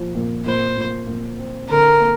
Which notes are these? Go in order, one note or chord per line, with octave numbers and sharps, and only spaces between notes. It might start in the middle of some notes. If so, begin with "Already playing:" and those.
Already playing: A#2 F3
A#2
A#2 C5
A#2
A#2
C4
D3 A#4
A#3